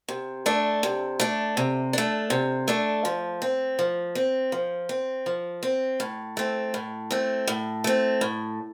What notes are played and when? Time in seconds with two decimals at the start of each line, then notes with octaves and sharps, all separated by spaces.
0.08 C3
0.46 A3 D4
0.83 C3
1.20 A3 D4
1.57 C3
1.93 A3 D4
2.30 C3
2.68 A3 D4
3.05 F3
3.42 C4
3.79 F3
4.15 C4
4.52 F3
4.89 C4
5.26 F3
5.63 C4
6.00 A2
6.37 A3 C4
6.74 A2
7.11 A3 C4
7.48 A2
7.84 A3 C4
8.21 A2